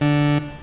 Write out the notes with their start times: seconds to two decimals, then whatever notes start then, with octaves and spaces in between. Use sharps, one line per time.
0.01 D3